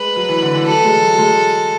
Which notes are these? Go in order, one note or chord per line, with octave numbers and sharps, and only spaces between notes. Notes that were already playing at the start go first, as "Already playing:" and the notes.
Already playing: G#3 B4
F#3
E3
D3
E3
F#3 A4
G#3
F#3
G#3